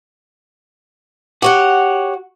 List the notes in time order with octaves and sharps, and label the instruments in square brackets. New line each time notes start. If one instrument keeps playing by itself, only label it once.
[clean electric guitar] F#4 [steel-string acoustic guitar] G4 C#5 F#5